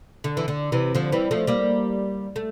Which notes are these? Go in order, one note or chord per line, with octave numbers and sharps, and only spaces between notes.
D3
E3
D3
C3 E3
D3 F3
E3 G3
F3 A3
G3 A#3
A3